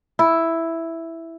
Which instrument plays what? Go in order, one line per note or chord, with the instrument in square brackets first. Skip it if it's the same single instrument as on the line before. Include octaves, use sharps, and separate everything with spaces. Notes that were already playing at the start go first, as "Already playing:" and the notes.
[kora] E4